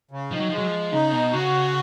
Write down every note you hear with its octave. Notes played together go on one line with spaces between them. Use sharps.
C#3
D#3 F3
F#3
F3 G#3
F#3
F3
C#3 D#4
B2
C#3 F#4